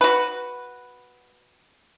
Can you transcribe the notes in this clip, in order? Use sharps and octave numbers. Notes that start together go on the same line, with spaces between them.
F#4 B4